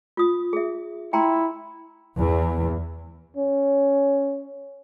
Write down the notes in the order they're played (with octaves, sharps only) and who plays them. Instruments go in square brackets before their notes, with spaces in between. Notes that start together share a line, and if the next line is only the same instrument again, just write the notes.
[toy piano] F4 D#6
G#4 E5
[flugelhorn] E4 [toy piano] G5 A#5 C6
[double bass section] E2
[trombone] C#4